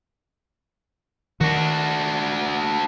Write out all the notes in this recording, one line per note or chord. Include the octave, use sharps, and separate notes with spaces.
D#3 D4 F#4